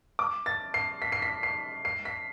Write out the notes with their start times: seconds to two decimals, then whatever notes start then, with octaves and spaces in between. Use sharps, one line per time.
0.19 D6
0.46 A6
0.74 C7
1.02 B6
1.12 C7
1.22 B6
1.43 C7
1.85 C7
2.05 B6